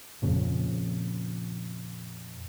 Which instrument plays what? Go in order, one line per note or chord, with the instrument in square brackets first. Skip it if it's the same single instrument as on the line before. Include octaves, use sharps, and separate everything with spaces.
[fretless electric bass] F2 A#2 C#3 F3